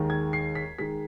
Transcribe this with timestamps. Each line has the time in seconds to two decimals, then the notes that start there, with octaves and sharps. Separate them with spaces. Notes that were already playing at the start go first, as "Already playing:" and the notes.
Already playing: D#2 D#3 G#3
0.10 G#6
0.33 C7
0.55 B6
0.78 D#3 G#3 B6